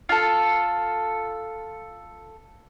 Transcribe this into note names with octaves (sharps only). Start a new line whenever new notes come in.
F4 A4